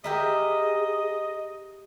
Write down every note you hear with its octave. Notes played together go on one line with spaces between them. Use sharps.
G4 G#4 A#4 D#5 E5